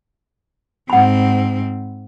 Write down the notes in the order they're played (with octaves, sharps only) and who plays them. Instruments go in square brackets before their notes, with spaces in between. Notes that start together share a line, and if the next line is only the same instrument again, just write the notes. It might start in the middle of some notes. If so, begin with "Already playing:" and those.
[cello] G#2 C4 [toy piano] F#5 B5